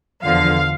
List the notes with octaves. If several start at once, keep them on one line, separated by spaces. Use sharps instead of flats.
E2 D3 F3 F5